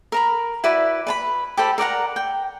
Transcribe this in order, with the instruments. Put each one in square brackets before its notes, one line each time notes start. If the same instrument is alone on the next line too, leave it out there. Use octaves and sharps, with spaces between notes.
[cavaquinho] A#4 A#5 B5
E4 F#4 B4 D5
B4 A5 B5
G4 A4 C5 B5
A#4 D5 F#5 A#5
G5